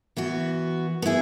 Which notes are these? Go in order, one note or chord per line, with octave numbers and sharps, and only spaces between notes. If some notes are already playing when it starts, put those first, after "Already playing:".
E3 B3 F#4
B3 E4 G#4